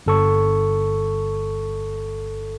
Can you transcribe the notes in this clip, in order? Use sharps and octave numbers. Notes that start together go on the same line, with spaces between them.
G1 A4 C#6